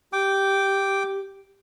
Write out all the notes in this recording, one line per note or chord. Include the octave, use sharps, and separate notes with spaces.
G4 G5 D6